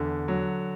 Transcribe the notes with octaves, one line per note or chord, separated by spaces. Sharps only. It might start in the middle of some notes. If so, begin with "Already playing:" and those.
Already playing: E2 D3
F#3